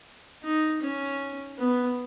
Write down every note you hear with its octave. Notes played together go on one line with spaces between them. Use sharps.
D#4
C#4
B3